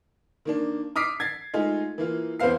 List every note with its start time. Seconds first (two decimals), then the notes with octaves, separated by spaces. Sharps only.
0.45 D#3 A#3 D4
0.96 D6 D#6 F6 B6 C7 D7
1.20 G#6 A6 C7
1.54 G#3 A3 D#4 F4
1.98 E3 A#3 F4
2.40 E2 B3 C4 C5 F5 C7